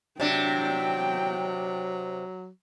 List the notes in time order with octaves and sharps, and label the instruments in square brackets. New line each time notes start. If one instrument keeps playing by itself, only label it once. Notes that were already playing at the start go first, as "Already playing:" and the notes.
[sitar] C3 D4 [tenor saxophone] F#3 [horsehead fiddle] G5